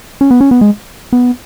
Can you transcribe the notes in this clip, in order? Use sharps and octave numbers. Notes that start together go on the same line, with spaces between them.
C#4
B3
C#4
B3
G#3
B3